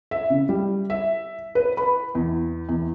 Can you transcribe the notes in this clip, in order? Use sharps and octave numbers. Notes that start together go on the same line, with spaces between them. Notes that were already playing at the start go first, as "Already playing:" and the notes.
E5
C#3
G3
E5
B4
B5
E2
E2